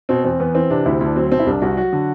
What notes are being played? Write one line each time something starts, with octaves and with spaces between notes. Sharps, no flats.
B2 C4
E2 C4
E2 B3
E3 C4
C3 D4
D2 E4
D2 D4
F#3 C4
B2 C4
E4
C2 D4
C2 F#4
F#3 F#4
D3